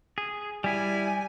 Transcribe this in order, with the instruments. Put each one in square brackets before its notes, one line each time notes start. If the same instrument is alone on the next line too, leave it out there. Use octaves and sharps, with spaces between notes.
[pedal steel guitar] G#4
[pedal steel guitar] G3 E4 [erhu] G#5